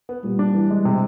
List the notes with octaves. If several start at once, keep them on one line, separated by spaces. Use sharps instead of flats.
B3
A#2 G3
D4
E3
G#3
C3